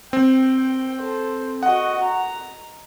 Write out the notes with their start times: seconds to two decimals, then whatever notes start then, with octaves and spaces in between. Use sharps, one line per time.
0.13 C4 G5
1.00 A4 C5
1.63 F#4 D#5 F#5
2.04 A#5